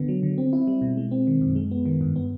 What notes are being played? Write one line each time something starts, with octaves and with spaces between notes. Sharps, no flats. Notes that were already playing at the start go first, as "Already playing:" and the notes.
Already playing: D3 B3
F#3
D3
C4
E4
G3
B2
G#3
C4
D#3
F#2
G#3
B3
D#3
G2
B3